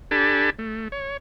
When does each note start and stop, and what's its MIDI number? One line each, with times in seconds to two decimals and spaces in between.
0.11 0.50 62
0.11 0.50 67
0.11 0.50 69
0.11 0.50 80
0.11 0.50 81
0.11 0.50 83
0.59 0.88 57
0.92 1.17 73